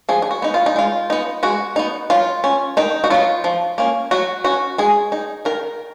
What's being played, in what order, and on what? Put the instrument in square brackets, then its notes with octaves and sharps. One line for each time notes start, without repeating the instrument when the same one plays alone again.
[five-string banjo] F3 G#4
G#4
F#4
B3 D#4
F4
D#4
G#3 F4
B3 D#4
G#3 F#4
B3 D#4
F#3 F4
C#4
D#3 D#4
F#4
F#3 B3 F4
F3
A#3 C#4
F#3 F#4
C#4 F#4
G#3 G#4
D#4
D#3 A#4